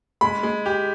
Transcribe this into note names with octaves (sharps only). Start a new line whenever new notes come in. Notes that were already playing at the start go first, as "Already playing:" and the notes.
G#3 B5
G#3
G4